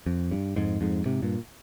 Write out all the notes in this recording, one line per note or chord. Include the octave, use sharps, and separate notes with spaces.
F2
G2
F2 G#2
F2 G#2
G#2 C3
G2 A#2